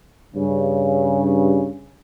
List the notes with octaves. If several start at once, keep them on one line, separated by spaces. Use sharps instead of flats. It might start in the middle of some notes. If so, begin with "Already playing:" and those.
G2 C#3